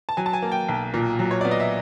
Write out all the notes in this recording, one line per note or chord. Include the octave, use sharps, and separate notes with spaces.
A5
F#3 G#5
A5
G#5
A#3
G5
B1
A#2
F#3
C#5
B3 D5
D#5
E5